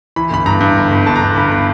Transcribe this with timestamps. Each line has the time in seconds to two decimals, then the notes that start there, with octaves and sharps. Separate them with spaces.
0.16 E3 B5
0.31 G1 B5
0.46 G2 A#5
0.61 G2
0.76 G1
0.91 G1
1.06 G1 A5
1.16 A#5
1.21 G1
1.35 G1 B5
1.52 B5